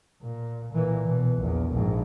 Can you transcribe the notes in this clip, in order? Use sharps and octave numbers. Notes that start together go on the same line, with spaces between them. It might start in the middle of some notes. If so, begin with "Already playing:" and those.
A#2
A#2 E3
B2 E3
A#1 E2
A#1 G#2